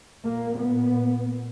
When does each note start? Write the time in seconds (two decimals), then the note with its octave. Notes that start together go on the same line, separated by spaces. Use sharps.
0.23 A#2 A#3
0.58 B3